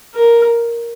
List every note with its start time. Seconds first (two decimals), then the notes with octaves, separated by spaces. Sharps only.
0.14 A#4